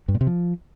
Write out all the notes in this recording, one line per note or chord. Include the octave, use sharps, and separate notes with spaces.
G2
A#2
C3
F3